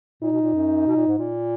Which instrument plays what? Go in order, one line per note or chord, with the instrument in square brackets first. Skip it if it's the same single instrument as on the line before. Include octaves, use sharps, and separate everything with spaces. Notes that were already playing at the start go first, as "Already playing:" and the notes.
[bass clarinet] A#2 [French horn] D#4
[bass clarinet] B2
A#2
F#2
B2
A#2
G#2
A#2